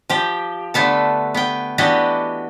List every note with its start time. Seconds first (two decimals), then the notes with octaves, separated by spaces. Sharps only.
0.09 F3 G4
0.74 D3 A3 B3 A4
1.35 B3 G5
1.78 E3 B3 D4 F#4 G4 D#5